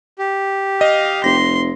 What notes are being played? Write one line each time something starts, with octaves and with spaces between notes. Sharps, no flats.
G4
D#5 F5
F1 C6 A#6